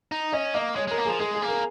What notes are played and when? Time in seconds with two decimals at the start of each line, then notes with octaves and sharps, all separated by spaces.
0.12 D#4
0.33 C#4 D#5
0.54 A#3 D#5
0.76 G#3 C#5
0.87 G#3 A#4
0.98 A#3
1.05 F3 G#4
1.19 G#3 G#4
1.35 G#4
1.42 A#3
1.48 A#4